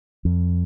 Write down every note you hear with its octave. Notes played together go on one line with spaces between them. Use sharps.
F2